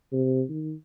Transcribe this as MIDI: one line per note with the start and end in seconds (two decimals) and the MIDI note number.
0.13 0.43 48
0.49 0.74 51